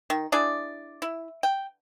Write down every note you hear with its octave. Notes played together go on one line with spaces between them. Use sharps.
D#3
D4 E4 G#4 D5
E4
G5